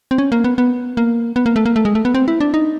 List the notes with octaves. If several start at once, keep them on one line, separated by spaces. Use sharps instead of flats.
C4
C#4
A#3
B3
B3
A#3
B3
A#3
A3
A#3
A3
G#3
A3
B3
C4
E4
D4
D#4